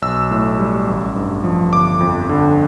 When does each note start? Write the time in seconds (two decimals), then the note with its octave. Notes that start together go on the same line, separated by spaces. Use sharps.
0.02 B1 E6
0.31 A2
0.59 G3
0.88 A1
1.16 G2
1.44 F3
1.72 G1 D6
2.00 F2
2.29 D3